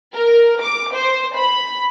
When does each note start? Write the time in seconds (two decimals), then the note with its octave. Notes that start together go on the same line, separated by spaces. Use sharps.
0.13 A#4
0.61 D6
0.93 C5
1.36 B5